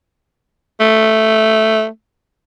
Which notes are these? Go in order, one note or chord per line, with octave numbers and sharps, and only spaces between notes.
A3